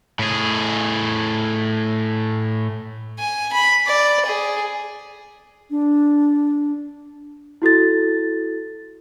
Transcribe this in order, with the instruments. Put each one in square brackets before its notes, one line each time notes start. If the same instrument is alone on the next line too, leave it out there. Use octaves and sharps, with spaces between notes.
[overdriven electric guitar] A2 G#4
[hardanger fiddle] G#5
B5
D5
G#4
[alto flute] D4
[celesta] E4 F#4 A4 A6